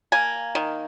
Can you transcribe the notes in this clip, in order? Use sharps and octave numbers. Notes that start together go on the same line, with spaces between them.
A#3 G#5
D#3